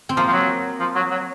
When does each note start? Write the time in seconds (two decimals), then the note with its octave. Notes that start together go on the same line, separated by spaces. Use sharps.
0.09 C4
0.17 F3 A#3
0.27 F3
0.33 F#3
0.80 F3
0.95 F#3
1.11 F#3